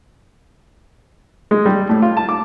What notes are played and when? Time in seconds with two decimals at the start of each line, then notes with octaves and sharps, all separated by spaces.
1.51 G#3
1.66 G3
1.89 A2
2.02 F4
2.17 A5
2.29 D6